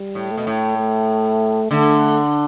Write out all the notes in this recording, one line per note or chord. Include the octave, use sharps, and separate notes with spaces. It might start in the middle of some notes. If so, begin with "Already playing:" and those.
Already playing: G3
A2
A3
B2
A2
A3
D3 A3